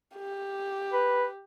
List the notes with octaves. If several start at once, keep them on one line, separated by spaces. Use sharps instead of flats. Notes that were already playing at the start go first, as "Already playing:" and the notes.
G4
B4